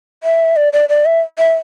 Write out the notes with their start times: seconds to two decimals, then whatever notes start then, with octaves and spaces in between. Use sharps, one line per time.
0.24 E5
0.56 D5
0.73 D5
0.89 D5
1.05 E5
1.38 E5